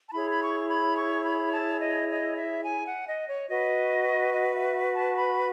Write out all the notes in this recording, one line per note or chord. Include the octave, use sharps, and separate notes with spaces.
A5
E4 G#4 C#5 B5
B5
C#6
B5
C#6
B5
A5
D#5
D#5
E5
G#5
F#5
D#5
C#5
F#4 B4 D#5
D#5
E5
A5
B5